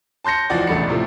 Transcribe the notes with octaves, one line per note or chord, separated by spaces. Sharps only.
A5 C6 G6 A#6 C#7
F1 E3 F3 F#4 D5
E1 A1 A3 D5 B5 C#7
A2 C3 F3 A3